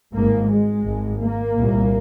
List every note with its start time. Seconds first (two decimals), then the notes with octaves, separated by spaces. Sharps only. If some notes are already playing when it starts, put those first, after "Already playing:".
0.14 G#1 G#2 A#3
0.49 G#3
0.84 G#1 G#2
1.20 A#3
1.56 C2 A#2